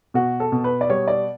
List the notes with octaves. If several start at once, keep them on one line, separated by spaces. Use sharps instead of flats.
B2 F#4
A4
B2
B4
D5
G3 C#5
D5